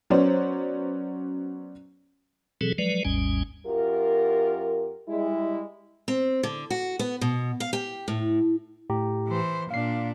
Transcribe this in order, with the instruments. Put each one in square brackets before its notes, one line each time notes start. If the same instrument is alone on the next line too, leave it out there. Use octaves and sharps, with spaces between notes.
[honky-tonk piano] F#3 B3 C#4 C5 D5
[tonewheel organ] B2 E3 F#3 C4 G#4 A4
F3 F#3 G#3 B4 D5
G#1 D#2 G#2 G3 C#4 G#5
[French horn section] F#2 F4 G4 A#4
G3 G#3 E4
[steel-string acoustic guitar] C4
D3
F#4
B3
B2
F5
G4
A2
[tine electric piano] A2 G4 A#5
[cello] E3 C5
[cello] A#2 D4 [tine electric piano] F5 C7